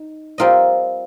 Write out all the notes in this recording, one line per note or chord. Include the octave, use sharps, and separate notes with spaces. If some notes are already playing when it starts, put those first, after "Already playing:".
Already playing: D#4
G3 C4 F4 A#4 D#5